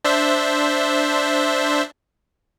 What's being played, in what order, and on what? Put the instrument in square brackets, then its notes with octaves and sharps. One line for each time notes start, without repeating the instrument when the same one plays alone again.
[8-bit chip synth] D4 C5 E5